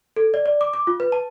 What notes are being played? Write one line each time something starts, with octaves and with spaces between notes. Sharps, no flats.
A4
D5
D5
D6
D6
F4
B4
A5